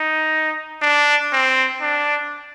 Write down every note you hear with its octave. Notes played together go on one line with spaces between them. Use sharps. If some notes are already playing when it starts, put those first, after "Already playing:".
Already playing: D#4
D4
C4
D4